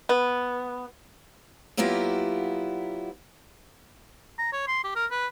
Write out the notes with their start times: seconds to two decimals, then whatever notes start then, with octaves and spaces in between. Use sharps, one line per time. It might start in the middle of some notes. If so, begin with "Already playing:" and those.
0.09 B3
1.77 F#3 A#3 B3 E4 F4 G4
4.39 A#5
4.52 C#5
4.67 C6
4.84 G4
4.95 A#4
5.11 B4